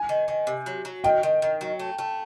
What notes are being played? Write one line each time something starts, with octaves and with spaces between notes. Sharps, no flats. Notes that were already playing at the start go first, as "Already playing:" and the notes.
Already playing: G#5
D#3
D#3
C3
F#3
F#3
D#3 G5
D#3
D#3
F#3
A3
A3